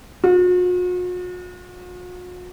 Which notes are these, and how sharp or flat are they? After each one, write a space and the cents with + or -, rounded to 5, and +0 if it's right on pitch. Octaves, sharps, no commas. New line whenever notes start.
F#4 -45